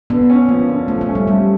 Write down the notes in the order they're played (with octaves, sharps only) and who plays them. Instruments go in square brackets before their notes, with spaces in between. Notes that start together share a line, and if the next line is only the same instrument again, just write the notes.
[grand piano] D3 [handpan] B3
[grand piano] C#4
[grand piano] F3 [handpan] A#3
[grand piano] D3
[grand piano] F3 [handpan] A3
[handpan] A3
[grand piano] C#4
[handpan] G3
[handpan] G3 [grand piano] A3